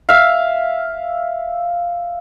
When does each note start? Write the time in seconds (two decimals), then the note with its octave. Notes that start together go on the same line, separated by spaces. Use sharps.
0.09 E5 F5